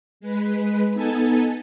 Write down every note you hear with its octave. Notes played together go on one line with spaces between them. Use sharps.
G#3 B4
B3 D#4 A4 G#5 A5